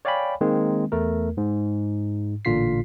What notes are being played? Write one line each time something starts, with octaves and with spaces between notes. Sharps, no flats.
C#5 D5 F5 G5 G#5 B5
D#3 G#3 A#3 C4
E2 A3 A#4
G#2
A1 A#2 D3 F4 B6 C7